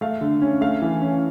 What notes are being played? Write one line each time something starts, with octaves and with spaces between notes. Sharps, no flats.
A3 F5
D3
C#4
A3 F5
E3
C#4